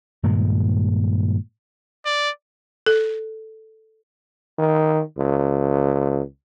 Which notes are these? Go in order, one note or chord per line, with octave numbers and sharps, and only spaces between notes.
G2 A#2 D#3 G#3
D5
A4
D#3
C#2